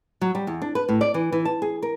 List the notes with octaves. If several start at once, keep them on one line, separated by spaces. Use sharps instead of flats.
F#3
G3
E2
D4
B4
A2
D5
E3
E3
A5
G#4
A#4